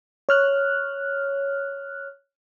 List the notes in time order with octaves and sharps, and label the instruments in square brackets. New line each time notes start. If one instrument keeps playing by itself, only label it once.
[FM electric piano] C#5 F6 F#6